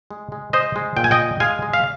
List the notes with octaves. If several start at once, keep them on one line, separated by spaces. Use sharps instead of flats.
G#3
G#3
G#3 C5 D#5
G#3
A#2 G5
G#5
D#5 G5
G#3
G#3 F5 G#5
G#3
F5